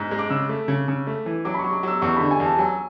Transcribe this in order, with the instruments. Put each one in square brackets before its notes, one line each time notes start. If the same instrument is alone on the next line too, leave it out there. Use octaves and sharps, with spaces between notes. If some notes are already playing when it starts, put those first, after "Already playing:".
Already playing: [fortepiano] G#2 [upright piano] F#6
[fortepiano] G#3
[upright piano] D6
[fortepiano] C#3 [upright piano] E6
[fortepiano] A3
C#3
C#3
A3
E3
[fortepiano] F#3 [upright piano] D6
[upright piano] B5
C#6
[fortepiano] F#3
[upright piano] D6
[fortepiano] F#3 [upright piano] E6
[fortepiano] E2 [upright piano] C#6
[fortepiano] D3 [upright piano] B5
[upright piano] G#5
[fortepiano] E2
[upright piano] A5
[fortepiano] F#3 [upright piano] G#5